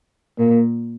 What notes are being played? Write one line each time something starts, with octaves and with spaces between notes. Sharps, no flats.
A#2 A#3